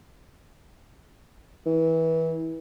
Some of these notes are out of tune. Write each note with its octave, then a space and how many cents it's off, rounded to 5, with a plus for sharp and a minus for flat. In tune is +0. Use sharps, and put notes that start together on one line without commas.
E3 -25